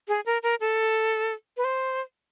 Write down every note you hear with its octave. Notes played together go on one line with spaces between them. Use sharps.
G#4
A#4
A#4
A4
B4
C5